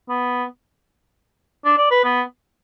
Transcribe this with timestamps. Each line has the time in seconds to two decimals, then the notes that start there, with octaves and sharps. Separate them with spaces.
0.09 B3
1.65 D4
1.78 D5
1.91 B4
2.04 B3